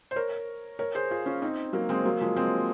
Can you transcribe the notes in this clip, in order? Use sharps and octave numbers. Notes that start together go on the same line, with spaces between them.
C5
A#4 C#5
A#4 C#5
G#4 C5
F4 G#4
C#4 F4
C4 D#4
F#3 A#3
G#3 C4
F#3 A#3
F3 G#3
G#3 C4